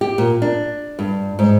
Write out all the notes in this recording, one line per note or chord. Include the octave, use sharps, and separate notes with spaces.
G4
A#2
D4
G2
G#2